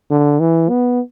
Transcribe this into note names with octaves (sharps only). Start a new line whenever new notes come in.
D3
E3
B3